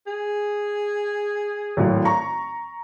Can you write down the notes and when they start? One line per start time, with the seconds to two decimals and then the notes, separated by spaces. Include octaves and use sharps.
0.07 G#4
1.77 G#1 A2 F#3
2.05 A#5 C#6